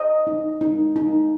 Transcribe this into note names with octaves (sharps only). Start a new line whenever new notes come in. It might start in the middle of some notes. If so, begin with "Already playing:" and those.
Already playing: C5 D#5
D#4
D#4
D#4